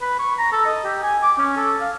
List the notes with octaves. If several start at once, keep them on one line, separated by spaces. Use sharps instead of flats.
B4
C#6
A#5
A4
D#5
G4
G#5
D6
C#4
A4
F5